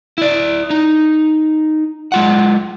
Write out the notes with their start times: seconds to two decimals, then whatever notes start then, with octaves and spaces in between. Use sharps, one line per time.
0.18 E4 D5
0.70 D#4
2.12 G#3 F4 F#5